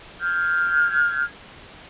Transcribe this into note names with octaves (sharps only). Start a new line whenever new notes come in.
F6 G6 G#6